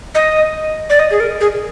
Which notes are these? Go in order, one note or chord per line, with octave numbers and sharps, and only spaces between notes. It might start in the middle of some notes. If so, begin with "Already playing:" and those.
D#5
D5
D#5
G#4
A#4
G#4